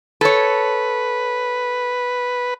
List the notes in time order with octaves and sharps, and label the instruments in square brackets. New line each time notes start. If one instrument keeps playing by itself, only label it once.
[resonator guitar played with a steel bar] A4 C#5 [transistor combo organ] B4